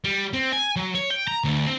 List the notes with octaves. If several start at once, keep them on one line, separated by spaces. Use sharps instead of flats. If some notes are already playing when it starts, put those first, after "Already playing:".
G3
C4
G#5
F#3
C#5
G5
A#5
D2
C4